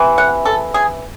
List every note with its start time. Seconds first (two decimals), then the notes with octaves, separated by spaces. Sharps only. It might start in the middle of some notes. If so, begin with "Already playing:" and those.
Already playing: C3 E3
0.18 F#5
0.45 A4
0.74 G#4